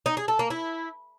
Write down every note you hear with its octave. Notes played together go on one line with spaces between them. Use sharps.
D#4
G#4
A4
A#3
E4